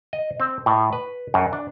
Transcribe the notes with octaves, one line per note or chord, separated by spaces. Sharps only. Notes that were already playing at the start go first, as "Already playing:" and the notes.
D#5
C4
A2
B4
F#2
D4